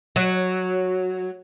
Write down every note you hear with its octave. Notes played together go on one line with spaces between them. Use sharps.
F#3